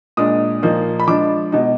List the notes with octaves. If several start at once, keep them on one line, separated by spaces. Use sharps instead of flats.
A#2 G#3 D4 D#6
A#2 F3 A#3 D#4
B5
F3 G#3 D4 D6
B2 G#3 D#4